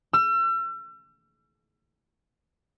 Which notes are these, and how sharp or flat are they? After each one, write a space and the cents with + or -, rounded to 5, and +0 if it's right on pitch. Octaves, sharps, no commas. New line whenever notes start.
E6 +40